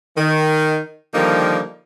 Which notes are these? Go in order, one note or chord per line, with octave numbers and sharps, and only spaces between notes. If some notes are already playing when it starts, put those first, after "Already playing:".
D#3
D3 D#3 F3 G3 A#3 D#4